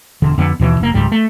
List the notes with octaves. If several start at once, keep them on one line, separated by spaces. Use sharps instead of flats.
E1 D3
F2 D3 B3
D#2 B2 E3
F1 A#3
C#2 G#2 G3
A3